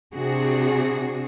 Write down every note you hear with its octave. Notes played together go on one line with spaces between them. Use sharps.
C3 C4 D4 F#4 G#4